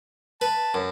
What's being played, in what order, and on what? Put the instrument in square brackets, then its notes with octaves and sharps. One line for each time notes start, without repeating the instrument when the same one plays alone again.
[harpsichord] B4 [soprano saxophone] A5
[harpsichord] F#2